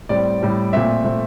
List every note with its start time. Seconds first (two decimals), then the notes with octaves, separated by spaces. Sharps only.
0.09 A2 G3 C4 D5
0.40 A2 G3 C4
0.73 A#2 A3 C4 E5
1.04 A#2 A3 C4